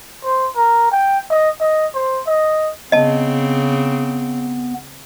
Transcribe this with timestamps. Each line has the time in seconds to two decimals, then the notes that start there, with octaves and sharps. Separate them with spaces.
0.24 C5
0.56 A#4
0.92 G5
1.30 D#5
1.60 D#5
1.94 C5
2.26 D#5
2.92 C#3 B3 C4 D#5 A5